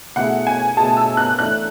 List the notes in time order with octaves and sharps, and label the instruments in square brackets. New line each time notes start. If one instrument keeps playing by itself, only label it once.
[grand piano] B2 A3 E4 G#4 [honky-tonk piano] F#5
[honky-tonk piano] G#5
[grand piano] B2 A3 E4 G#4 [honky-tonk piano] A5
[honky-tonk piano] E6
F#6
[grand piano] E3 A3 D4 A4 [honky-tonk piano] F#6